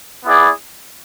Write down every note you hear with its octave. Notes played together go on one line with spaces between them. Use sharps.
B3 E4 G#4 D5